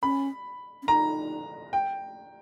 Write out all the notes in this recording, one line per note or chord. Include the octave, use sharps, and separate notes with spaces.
C#4 B5
C#4
D#4 A#5
G5